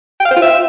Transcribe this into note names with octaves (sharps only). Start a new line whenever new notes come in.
G5
F5
C5
F4
E5